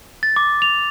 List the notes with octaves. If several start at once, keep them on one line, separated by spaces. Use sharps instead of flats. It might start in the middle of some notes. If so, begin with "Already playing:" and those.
A6
D6
F7